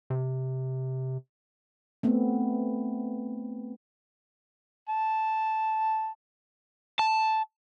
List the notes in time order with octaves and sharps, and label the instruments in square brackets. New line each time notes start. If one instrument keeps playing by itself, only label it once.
[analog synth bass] C3
[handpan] A3 B3 C4
[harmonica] A5
[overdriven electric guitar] A5